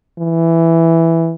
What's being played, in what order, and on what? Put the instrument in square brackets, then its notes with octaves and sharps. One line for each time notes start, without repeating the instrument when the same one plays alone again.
[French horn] E3